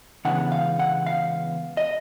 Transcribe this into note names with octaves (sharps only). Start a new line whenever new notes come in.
C#3 E3 G#3 B3 D4 F#5
F5
F#5
F5
D#5